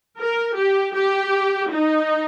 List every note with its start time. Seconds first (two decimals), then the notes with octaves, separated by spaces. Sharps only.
0.18 A#4
0.56 G4
0.94 G4
1.71 D#4